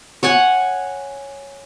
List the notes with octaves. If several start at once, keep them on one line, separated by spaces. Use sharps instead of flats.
C#5 F#5 G#5